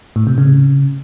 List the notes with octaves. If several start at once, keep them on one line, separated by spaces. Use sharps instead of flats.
A2
C3
C#3